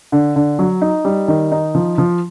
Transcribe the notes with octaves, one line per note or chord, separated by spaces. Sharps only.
D3
D3
F#3
D#4
G3
D#3
D#4
F3
F3